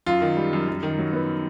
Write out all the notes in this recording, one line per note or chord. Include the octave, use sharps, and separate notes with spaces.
F#2 F4
D#3
G3
F#2
F#2
D#3
F#3
B3